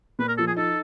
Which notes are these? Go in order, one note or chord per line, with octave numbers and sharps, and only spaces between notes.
A#2 B4
A#4
F3 A4
G#4
D#4 A4